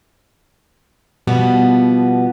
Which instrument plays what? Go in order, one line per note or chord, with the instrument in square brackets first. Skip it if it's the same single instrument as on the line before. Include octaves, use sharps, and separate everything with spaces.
[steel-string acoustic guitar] B2 F3 G3 B3